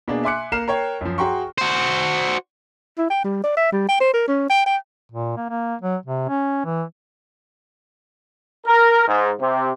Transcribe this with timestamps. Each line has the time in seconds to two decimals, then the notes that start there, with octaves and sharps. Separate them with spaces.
0.08 B2 A#3 D4 G#4
0.24 E5 G#5 C6 D6 F#6 C#7
0.52 A#3 A#4 F6 C7 E7
0.68 A#4 C#5 G5
1.01 F#2 F3
1.18 F#4 G#4 G5 A#5 C6 C#6
1.58 F#4 C5
2.98 E4
3.10 G5
3.24 G3
3.44 D5
3.57 E5
3.72 G3
3.89 G5
4.01 C5
4.14 A#4
4.28 C#4
4.50 G5
4.66 G5
5.12 A#2
5.37 A#3
5.50 A#3
5.82 F#3
6.06 C3
6.29 C#4
6.65 E3
8.66 A#4
9.08 G#2
9.41 C3